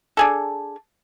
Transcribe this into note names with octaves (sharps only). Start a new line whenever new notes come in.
D4 G#4 A4